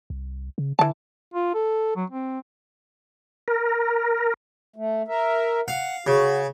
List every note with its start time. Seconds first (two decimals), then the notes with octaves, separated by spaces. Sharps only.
0.10 C2
0.58 C#3
0.79 D3 E3 A5
1.34 F4
1.54 A4
1.96 F#3
2.10 C4
3.48 A#4
4.76 A3
5.08 A#4 E5
5.68 F5 F#5
6.07 C#3 F#4